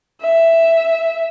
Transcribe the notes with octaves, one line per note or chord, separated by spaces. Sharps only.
E5